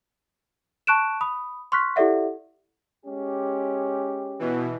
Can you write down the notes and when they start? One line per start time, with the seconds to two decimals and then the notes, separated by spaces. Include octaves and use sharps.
0.87 A5 C#6 F#6 D7 E7
1.21 B5 D#6
1.72 C6 C#6 F6 F#6 B6
1.96 E4 G4 A4 D5 E5 F#5
3.06 G#3 C#4 G4
4.39 B2 E3